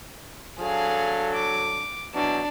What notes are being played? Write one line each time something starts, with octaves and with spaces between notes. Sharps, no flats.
F#3 D4 G#4 A4 F5
D6
B2 E3 F#3 D4